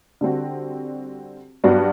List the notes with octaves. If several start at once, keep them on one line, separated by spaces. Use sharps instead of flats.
D3 G3 C4 F#4
G2 F#3 B3 D4 F#4